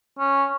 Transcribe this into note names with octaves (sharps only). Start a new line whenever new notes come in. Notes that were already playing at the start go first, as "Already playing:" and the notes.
C#4